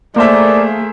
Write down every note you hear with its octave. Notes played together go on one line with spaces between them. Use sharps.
A3 A#3 G#4 A#4 C5 D5 E5